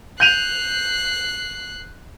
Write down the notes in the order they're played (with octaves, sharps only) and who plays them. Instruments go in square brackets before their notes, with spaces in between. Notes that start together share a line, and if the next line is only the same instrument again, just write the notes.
[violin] F#6 C7 [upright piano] G6 D#7 F7